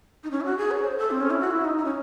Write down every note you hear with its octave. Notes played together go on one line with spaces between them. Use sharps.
D#4
C#4
E4
F#4
G#4
C#5
C5
A4
C4
C#4
E4
F#4
E4
D#4
D#4
C#4